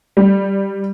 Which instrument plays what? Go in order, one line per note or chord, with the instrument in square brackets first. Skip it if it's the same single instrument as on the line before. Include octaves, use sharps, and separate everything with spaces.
[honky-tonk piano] G3